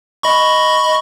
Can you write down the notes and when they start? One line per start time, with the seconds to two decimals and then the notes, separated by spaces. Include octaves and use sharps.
0.23 D#5 B5 C#6